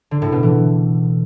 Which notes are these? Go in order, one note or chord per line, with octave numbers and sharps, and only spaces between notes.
D3
A2
B2
E3